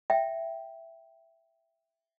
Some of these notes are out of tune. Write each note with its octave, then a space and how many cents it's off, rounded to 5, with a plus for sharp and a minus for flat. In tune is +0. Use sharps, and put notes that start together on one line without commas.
E5 +5 G5 +0